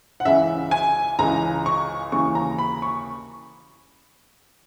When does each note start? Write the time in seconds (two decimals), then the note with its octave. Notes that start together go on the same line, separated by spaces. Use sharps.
0.20 F#5
0.25 C#2 C#3 E3 E5
0.71 G#5
1.19 C#2 C#3 E3 A#5
1.66 C#6
2.12 D#2 C#3 E3 C#6
2.35 A#5
2.58 B5
2.82 C#6